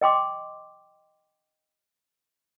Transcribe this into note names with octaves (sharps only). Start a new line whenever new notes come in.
D#5 G5 C6 D6